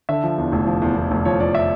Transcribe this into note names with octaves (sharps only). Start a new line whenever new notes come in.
D3 E5
F3
E2
F1
F3
E2
E2
F1
F3 C#5
F3 D5
E5